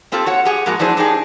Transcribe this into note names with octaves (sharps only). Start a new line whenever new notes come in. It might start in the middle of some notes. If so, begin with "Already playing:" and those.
A#3 C4 F4 G4 A4
F#4 C#5 F#5
G4 G#4 F#5
A2 F3 G#3 A#3 F#4
F3 D4 E4 G#4 C5
D4 D#4 G4 G#4